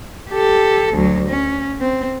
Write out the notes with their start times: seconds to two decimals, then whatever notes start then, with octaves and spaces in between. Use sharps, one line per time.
0.31 G4 A4
0.94 D2 F#3
1.29 C#4
1.81 C4